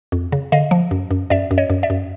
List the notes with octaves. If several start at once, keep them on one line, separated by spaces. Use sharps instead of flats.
F2
C#3
D3 D#5 F5
F3
F#2
F#2
F#2 D5 E5
F#2
C#5 D#5
F#2
D5 E5
F#2